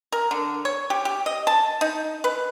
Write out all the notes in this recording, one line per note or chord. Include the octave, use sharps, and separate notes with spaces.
A#4
D3
C#5
G4
G4
D#5
A5
D#4
B4